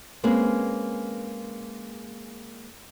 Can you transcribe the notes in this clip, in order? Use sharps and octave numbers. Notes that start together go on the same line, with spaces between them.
G#3 A#3 C4 C#4 G#4 B4